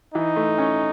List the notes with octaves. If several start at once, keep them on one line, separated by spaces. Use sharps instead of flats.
E3 D#4
A3
C#4